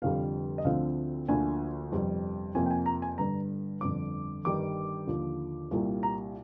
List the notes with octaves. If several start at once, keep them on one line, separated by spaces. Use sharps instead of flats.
F1 F2 D3 G3 F5
D#5
D2 D3 F3 C4 F5
D2 D3 F3 A#3 D4 G#5
G1 F2 C3 G3
F2 C3 F3 A#3 G#5
G5
G#5
A#5
G#5
G1 G2 D3 A#5
G1 F2 D3 D6
G1 G2 D#3 G3 D6
D#2 D3 F3
C2 A#2 G3 A#3
A#5